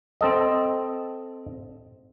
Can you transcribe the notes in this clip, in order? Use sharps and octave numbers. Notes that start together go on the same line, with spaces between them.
C4 A4 D#5